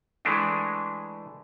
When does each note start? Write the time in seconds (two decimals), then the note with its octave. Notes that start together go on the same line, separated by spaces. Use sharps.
0.25 E3 G#3 A3 D4